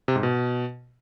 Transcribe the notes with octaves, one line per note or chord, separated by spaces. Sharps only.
C3
G#2
B2